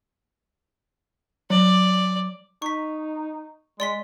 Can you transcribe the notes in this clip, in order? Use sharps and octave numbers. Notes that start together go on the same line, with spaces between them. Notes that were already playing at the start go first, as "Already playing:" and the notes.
F#3 D5
D#4 C#6 B6
G#3 D5 C6 B6